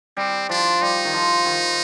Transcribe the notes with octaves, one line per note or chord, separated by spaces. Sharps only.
G3 C4
F3 D4
G3 D#4
D#3
F3
D#3